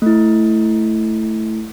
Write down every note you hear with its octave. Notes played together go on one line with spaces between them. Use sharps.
A3 E4